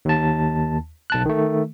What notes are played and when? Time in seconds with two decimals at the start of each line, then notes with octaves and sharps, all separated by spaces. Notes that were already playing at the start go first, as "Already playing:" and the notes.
0.05 D#2 A5
1.10 B1 A5 F#6
1.26 D#3 A3